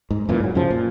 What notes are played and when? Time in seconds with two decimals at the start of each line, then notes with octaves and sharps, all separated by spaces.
0.11 G#2
0.29 F#2 A#2 E3
0.41 G#2 F#3
0.55 F#2 C#3 F3
0.71 A#2